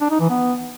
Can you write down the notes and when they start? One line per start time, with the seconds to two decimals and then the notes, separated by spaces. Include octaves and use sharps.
0.01 D4
0.11 D#4
0.20 E3
0.30 B3